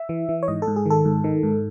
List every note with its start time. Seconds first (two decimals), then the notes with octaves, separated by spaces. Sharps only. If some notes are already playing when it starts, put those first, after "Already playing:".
Already playing: E5
0.09 E3
0.29 E3
0.43 C#5
0.48 G#2 D#5
0.62 A4
0.67 G#2
0.76 G#4
0.86 D#3 A4
1.05 G#2
1.24 D#3
1.43 G#2